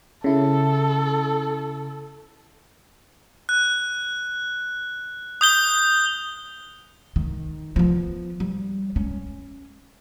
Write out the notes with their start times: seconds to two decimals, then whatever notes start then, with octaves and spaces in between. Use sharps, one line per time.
0.24 C#3 E4 A4
3.49 F#6
5.41 D#6 G6 G7
7.16 D#3
7.76 F3 B3
8.40 G3
8.96 C#4